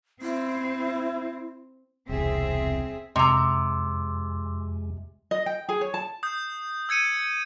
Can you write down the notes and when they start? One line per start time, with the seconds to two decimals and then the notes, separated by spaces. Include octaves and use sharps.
0.22 C4 E4
2.09 E1 C2 C4 G#4 E5
3.16 F2 C3 G#3 A#5 C6 D6 E6
5.31 D#5
5.46 G5
5.69 G#4
5.81 C#5
5.94 A5
6.23 D#6 G6
6.89 E6 G#6 C#7 D#7